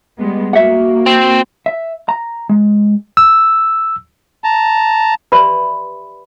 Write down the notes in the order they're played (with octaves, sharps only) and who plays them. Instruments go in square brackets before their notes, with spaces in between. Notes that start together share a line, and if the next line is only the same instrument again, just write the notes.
[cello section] G3 G#3 B3
[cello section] A#3 [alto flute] F#4 [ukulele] E5 F#5
[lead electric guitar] C4
[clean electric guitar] E5
A#5
G#3
[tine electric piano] E6
[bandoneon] A5 A#5
[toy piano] G4 B4 D5 E5 B5 C6